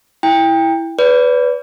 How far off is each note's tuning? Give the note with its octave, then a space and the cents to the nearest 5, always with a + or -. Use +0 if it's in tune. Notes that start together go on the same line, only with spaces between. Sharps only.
E4 +0 G5 +25
B4 +0 D5 -40